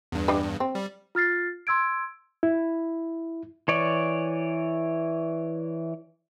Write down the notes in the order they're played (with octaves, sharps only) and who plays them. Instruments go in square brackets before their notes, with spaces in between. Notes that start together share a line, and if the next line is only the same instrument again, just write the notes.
[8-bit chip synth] E2 G2
[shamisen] D4 G4 B4
C4
[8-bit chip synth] G3
[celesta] F4 F6 A6 C7
C6 E6 G#6 D7
[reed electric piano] E4
[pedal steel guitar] E3 C#5 D5